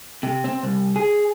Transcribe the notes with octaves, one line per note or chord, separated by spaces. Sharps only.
C3
C4
C2
G#4